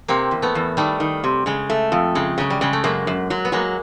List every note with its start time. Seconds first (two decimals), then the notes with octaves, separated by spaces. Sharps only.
0.08 C3 A#3 C4
0.31 E2
0.42 A3 B3
0.55 E2
0.77 D#3 G3 A3
1.00 D#3
1.24 C3
1.46 C#3 G#3
1.70 A3
1.92 F2
2.15 C#3 G#3
2.38 C#3 F#3
2.50 G3
2.61 C#3 G#3
2.73 A3
2.84 F#2 G#3 A#3
3.07 F#2
3.30 F#3
3.45 B3
3.52 F#3 G#3 A#3